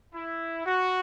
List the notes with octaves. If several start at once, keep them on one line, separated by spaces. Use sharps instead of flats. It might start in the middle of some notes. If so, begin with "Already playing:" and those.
E4
F#4